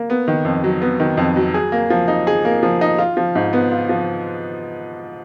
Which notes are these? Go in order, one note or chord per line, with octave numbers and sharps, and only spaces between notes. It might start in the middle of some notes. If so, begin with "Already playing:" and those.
Already playing: A#3
B3
D#3
F2
F#3
B3
D#3
F2
F#3
G#4
A#3
F3
D#4
G#4
A#3
F3
D#4
F4
F3
G#2
B3
F4
F3